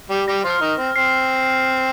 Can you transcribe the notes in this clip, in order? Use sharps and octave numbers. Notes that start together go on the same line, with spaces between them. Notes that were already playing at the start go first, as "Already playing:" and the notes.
G3 G4
G3 G4 A#6
F3 F4
F6
D#3 D#4
C4
C4 C7